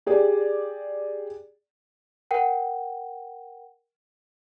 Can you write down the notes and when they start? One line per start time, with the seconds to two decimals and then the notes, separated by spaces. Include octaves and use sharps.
0.06 G4 G#4 D5
2.31 A#4 F#5 G5